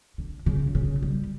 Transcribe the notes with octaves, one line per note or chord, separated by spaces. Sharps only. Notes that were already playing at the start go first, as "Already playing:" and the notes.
D3
C#3
C#3
G3